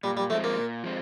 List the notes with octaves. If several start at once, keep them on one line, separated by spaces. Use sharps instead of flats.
A#2 G3
G3
F3 G#3 A3 C4
A#3
A#2
F3 G#3 C4